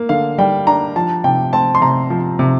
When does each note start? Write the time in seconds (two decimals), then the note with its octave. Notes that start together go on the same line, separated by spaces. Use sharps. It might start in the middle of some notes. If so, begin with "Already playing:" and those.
Already playing: A#3
0.09 D3 F5
0.38 G3 G5
0.67 D4 A#5
0.96 F3 A5
1.24 C3 G5
1.53 C4 A5
1.75 C6
1.82 C3 A#5
2.10 F3
2.39 C3